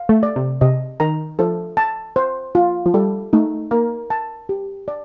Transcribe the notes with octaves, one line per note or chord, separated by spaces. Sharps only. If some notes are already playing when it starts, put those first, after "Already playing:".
Already playing: F5
A3
D5
C3
C3 D#5
D#3 A#5
F3 A4
A5
C5
F4
F3
G3 A4
A3 D#4
A#3 A#4
A5
G4
D5